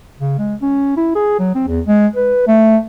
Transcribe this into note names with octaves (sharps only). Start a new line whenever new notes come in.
C#3
G#3
C#4
E4
G#4
F#3
C4
E2
G#3
B4
A3